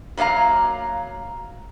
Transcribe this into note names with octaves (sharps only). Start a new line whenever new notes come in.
F#3 A#3 D5 F5 A#5